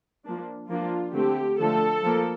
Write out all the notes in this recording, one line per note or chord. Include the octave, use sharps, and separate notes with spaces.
F3 A#3 D4
F3 A#3 D4 F4
D3 A3 C4 G4
D3 F3 A3 A4
F3 A#3